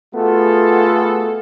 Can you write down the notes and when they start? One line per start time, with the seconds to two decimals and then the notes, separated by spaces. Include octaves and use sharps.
0.15 A3 B3 F4 F#4 G#4 A4